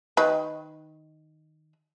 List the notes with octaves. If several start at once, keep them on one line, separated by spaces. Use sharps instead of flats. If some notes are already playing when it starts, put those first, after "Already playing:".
D#3 B4